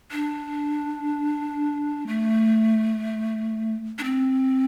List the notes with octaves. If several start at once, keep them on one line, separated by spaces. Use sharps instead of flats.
D4
A3
D4
C4